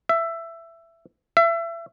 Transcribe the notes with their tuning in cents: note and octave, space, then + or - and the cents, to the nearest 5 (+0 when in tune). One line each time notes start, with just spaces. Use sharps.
E5 +15
E5 +30